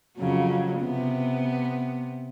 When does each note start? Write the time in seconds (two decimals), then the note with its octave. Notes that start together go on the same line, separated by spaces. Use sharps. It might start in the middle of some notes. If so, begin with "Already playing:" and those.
0.18 F2 C#3 F#3
0.80 C3 B3